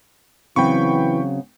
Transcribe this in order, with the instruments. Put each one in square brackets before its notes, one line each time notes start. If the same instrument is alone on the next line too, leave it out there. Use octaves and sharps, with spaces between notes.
[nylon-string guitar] C#3 F#3 C4 [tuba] E3 [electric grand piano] G5 B5 C#6